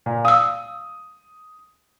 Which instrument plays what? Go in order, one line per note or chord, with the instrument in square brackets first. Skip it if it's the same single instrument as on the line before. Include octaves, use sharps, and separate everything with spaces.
[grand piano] A#2
[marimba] F5 E6 [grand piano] D#6